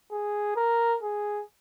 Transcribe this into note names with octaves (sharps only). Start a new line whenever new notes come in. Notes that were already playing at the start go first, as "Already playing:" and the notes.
G#4
A#4
G#4